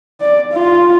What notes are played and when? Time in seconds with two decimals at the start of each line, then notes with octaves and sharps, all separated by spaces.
0.21 D5
0.52 F4